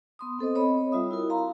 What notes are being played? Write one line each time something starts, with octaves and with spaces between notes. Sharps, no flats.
B3 C6 D#6
C4 A4 C5 D#5
C4 C#5 D#5 B5
G3 F4 E5 D#6
E4 F#4 A#4
F5 A#5 C6